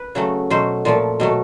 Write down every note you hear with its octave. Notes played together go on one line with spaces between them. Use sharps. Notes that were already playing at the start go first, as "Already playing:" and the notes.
Already playing: B4
C#3 F#3 A3
B2 F#3 A3 C5
A#2 F3 A3
B2 F#3 A3